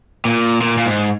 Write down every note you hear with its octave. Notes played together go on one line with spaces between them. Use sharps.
A#2
A#2
A#2
G#2